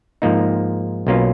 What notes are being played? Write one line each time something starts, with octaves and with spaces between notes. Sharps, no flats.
G#2 F3 A#3 D#4
B1 B2 A#3 C#4 F4